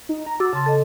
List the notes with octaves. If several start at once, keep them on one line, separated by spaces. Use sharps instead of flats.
D#4
A#5
F#4 D6 E6 A6
C#3 A5 C6 A6
A4 D#5